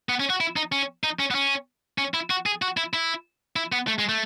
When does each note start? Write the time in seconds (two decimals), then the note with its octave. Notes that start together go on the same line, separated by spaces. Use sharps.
0.09 B3
0.20 C#4
0.30 F#4
0.40 E4
0.56 D#4
0.72 C#4
1.04 D#4
1.19 C#4
1.31 B3
1.35 C#4
1.98 C#4
2.14 E4
2.30 F#4
2.46 G#4
2.62 F#4
2.77 E4
2.93 E4
3.56 E4
3.72 B3
3.87 A3
3.99 G#3
4.09 A3